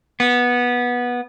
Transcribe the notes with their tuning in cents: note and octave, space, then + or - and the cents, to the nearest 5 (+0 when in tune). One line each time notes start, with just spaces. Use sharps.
B3 -15